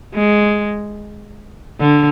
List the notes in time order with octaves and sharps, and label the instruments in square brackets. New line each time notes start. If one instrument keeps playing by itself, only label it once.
[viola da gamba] G#3
D3